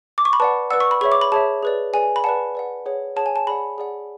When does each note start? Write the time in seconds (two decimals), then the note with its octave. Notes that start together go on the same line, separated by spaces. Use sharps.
0.18 D6
0.25 C#6
0.33 B5
0.40 B4 D5 F#5 A5
0.70 B4 D5 F#5 E6
0.80 C#6
0.91 B5
1.01 G#4 C#5 E5 C#6
1.12 D6
1.21 B5
1.32 G#4 C#5 E5 A5
1.63 G#4 B4 D5
1.93 G#4 B4 D5 G#5
2.16 B5
2.24 B4 D5 F#5 A5
2.55 B4 D5 F#5
2.86 G#4 C#5 F#5
3.16 G#4 C#5 F#5 A5
3.26 G#5
3.36 A5
3.47 G#4 D5 F#5 B5
3.78 G#4 D5 F#5